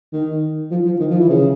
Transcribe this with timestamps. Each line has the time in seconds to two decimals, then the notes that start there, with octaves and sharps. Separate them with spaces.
0.13 D#3
0.71 F3
0.85 F3
1.00 D#3
1.10 F3
1.20 E3
1.29 C#3